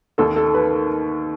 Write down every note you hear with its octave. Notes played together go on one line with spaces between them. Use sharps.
D#2 D#3 A4
A4
B4